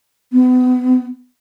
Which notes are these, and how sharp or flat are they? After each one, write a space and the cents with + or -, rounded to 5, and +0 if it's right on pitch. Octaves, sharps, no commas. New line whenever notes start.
B3 +35